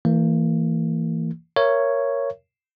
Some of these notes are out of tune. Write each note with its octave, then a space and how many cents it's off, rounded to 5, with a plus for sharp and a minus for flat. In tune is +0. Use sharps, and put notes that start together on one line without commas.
E3 +0 A#3 -35
A#4 +0 C#5 +0 E5 +35